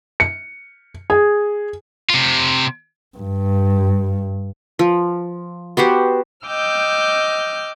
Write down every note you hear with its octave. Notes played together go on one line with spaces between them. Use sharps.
C#7
G#4
C3 F4
G2
F3
B3 F#4 G4 C5
D#5 G5 D6 E6 F6 G6